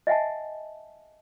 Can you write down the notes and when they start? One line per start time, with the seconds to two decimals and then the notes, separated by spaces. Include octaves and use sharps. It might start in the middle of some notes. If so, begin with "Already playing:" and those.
0.07 D#5 E5 F#5 G#5 A5